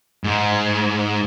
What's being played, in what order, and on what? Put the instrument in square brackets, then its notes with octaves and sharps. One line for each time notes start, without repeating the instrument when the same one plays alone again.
[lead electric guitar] G#2